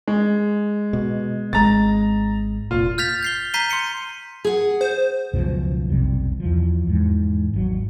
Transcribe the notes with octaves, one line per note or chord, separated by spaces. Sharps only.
G#3
B2
G#1 G#3 A#5 A6
F1 A#2 F4
F6 G6 A6 B6 F7
G6 C7 G7
A#5 G6 B6 C7 D#7 G7
C6 C7 C#7 D#7
G#4 F#5
C5
C#2 F#2 B2 F3
F1 B1 C3 G3
E2 F3
E2 G#2
G#1 F#3